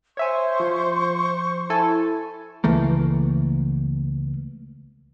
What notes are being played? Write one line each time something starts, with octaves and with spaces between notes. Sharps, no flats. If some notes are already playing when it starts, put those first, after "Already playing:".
C5 C#5 E5 G#5 C#6
F3
E4 A4 G#5
C#2 E3 A3 A#3